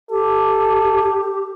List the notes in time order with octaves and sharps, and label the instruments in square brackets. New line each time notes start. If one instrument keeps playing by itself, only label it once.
[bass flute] G4 [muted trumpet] A4